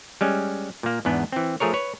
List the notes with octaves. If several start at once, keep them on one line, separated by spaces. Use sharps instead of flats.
G3 G#3 C#4
A#2 A#3
E2 G#2 B3 D4
E3 C4
F3 A3 G#4 A#4 C#5
B4 C#5